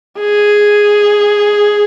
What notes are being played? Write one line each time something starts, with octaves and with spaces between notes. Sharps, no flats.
G#4